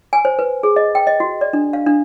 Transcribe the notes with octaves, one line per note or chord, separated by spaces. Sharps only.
G#5
C5
B4
G#4
D#5
G5
D#5
F#4
D5
D4
F5
D4